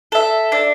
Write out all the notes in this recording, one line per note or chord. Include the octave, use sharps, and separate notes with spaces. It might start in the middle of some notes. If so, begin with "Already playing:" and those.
A4 E5
D4